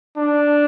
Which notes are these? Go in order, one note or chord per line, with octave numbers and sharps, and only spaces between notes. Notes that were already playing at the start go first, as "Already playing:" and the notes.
D4